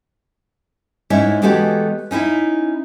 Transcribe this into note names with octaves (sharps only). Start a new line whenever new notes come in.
G#2 G#3 C#4 E4 E5
E3 G#3 A3 B3 F#4 G4
C#4 D#4 E4 E5